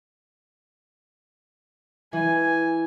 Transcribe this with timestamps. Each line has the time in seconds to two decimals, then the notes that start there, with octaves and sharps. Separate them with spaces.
2.13 E3 G#5